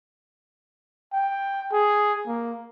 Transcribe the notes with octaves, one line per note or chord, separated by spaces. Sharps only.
G5
G#4
A#3